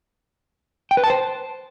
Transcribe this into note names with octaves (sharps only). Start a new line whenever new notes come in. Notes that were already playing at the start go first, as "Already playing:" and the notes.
G5
B4
A5
C5